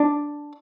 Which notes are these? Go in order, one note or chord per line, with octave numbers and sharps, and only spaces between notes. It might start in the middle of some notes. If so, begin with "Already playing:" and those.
Already playing: D4